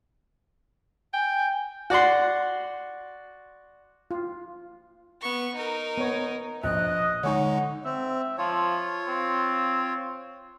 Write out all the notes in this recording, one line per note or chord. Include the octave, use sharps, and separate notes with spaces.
G5 G#5
F#4 D5 F#5 C6
F4
B3 C#6
D#4 A#4
B3 C#5
A#1 D#5 F#6
D3 G#3 D#4 C#5 F#5 G#5 C#6
C4 E5
F3 F4 C#5
C4